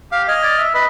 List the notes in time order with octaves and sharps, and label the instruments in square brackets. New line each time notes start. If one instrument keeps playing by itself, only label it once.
[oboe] G4 [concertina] F5
[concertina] D#5 F6 [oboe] G#5
[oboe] D5
E5
[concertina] B4 D#5 [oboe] B5